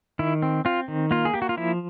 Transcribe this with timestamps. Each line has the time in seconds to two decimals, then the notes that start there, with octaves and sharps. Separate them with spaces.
0.19 D#3 E4
0.42 C4
0.65 C4 F4
0.88 D#3
1.11 A#3 F4
1.25 G#4
1.34 A#3 G4
1.42 F#4
1.49 F4
1.57 F3 E4